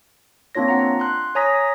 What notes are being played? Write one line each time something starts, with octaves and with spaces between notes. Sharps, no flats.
A#3 C4 D4 F4 C#5 A#6
F#5 A#5
C6 F#6
C#5 G#5 A#5 D#6 A#6 B6